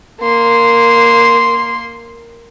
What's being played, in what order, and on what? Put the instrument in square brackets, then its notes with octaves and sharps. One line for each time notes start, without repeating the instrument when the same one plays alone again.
[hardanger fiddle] A#3 C6